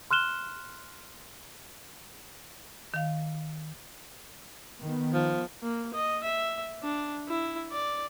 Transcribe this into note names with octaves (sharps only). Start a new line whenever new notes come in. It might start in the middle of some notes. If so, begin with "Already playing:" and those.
C6 F6 F#6 E7 G7
D#3 F5
D#3 B3
F3
A#3
D#5
E5
D4
E4
D5